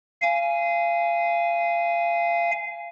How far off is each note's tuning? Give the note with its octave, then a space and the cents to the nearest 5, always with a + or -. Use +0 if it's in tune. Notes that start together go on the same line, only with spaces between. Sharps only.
F5 -25 G#5 +0